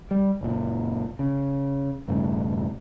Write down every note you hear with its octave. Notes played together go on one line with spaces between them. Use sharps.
G3
F#1 A#2
C#3
E1 G2 C#3 A3